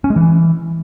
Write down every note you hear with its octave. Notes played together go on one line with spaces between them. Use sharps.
C#4
G#3
E3